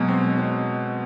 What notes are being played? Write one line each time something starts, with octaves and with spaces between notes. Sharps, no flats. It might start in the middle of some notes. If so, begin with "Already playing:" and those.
Already playing: B2 F#3 G#3
C4
C4